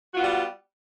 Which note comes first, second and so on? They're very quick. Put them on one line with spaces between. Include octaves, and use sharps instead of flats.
F#4 F4 B3 G3